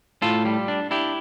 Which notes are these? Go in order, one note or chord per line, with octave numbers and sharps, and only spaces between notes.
A2 F4 A4
G3
D4
D4 E4 G4